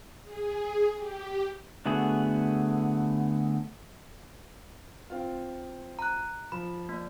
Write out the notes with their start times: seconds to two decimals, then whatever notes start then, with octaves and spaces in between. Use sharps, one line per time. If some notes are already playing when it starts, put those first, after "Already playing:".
0.23 G#4
0.97 G4
1.86 D3 A3 B3 F#4 G#4
5.10 C4 F4
5.99 A#5 F#6
6.52 F3 B5
6.89 A#3 D5